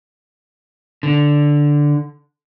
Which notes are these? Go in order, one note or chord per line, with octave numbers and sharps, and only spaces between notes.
D3